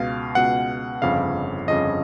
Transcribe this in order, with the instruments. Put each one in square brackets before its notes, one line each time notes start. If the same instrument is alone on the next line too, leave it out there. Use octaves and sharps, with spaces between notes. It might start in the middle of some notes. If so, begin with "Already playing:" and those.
Already playing: [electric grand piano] C#2 B2 F5
C#2 B2 F#5
G1 F2 C#3 F5
G1 F2 C#3 D#5